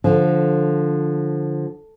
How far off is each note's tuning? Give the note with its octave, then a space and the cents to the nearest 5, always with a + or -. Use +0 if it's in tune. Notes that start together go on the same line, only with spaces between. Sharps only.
D3 +0 F3 +0